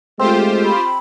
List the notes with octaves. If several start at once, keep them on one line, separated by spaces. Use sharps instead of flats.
G#3 A3 C4 F4 G4 C5
B5